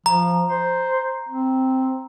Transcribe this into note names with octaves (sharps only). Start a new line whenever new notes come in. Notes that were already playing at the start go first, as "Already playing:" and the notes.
F3 A#5
C5
C4